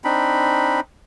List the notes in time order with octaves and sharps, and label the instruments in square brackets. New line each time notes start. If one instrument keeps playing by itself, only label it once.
[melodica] C4 D4 D#4 B5